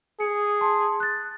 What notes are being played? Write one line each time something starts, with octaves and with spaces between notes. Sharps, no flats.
G#4 C#7
A5 C6
F#6 A6